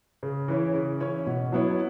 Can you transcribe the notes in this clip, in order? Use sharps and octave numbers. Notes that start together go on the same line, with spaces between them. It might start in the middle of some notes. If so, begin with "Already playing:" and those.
C#3
E3 C#4 E4 C#5
C#3
E3 C#4 E4 C#5
B2
F#3 B3 E4 C#5